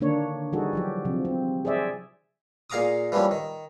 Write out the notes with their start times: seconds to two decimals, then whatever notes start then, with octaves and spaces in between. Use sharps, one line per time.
0.01 D3 D#3 A#3 D4 C#5
0.53 E3 G3 D#4 F#4 G#4 A4
0.73 F3 F#3 G4
1.05 C3 F3
1.25 C4
1.65 G#4 C5 D5 E5
2.70 A#2 G#4 F5 A#5 D6 D#6
3.12 E3 F3 G3 A#3 C#4
3.31 D#3